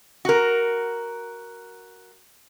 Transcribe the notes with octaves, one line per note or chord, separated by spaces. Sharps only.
F#4 A#4